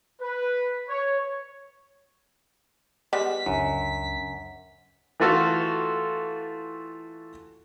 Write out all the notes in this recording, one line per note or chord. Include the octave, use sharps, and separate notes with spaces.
B4
C#5
G3 G#3 B3 B6
C#2 F#2 C#3 D4
E3 A3 F4 F#4 A4